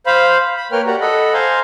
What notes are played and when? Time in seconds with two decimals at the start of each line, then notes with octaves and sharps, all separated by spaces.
0.06 C5 F5 B5
0.57 B5
0.72 A#3 A#4 B4 C#5 G5 F6
0.87 F#4 G4 D5 F#5 A#5
1.01 A4 D#5 F#5 B5
1.33 C5 F5 G#5 A#5 C6